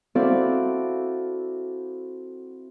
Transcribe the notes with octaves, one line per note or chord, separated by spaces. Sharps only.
C4 E4 F#4 A4 D5 F5